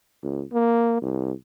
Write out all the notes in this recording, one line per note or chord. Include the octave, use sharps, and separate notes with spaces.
C#2
A#3
C2